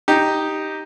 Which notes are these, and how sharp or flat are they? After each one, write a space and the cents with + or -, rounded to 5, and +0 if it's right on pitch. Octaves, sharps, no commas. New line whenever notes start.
D#4 +0 G4 +0